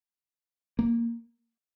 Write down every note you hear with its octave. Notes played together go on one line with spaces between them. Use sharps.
A#3